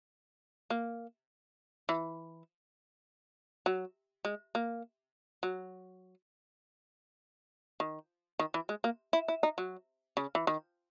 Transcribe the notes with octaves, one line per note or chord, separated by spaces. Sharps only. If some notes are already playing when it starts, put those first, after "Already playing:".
A#3
E3
F#3
G#3
A#3
F#3
D#3
D#3
E3
G#3
A#3
E4
E4
D#4
F#3
C#3
E3
D#3